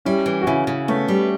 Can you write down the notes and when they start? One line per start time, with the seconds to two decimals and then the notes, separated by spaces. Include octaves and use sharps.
0.05 G3 C#4 E4
0.26 E3
0.41 F#4
0.47 C#3 C#4 E4
0.67 C#3
0.88 A3 B3 C#4
1.08 G3